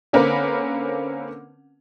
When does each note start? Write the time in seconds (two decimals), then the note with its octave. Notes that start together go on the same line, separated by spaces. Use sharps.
0.13 D3 A#3 C4 C#4 A#4 B4